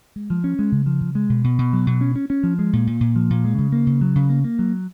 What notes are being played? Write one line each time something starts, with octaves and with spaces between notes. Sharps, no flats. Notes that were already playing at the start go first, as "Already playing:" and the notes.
G#3
F3
C#4
G#3
C#3
F3
C#3
G#3
B2
B2
B2
F#3
B2
C#4
C#4
C#4
F3
G#3
A#2
A#2
A#2
F3
A#2
G#3
C#3
A#3
C#3
F#3
C#3
A#3
A#3
F#3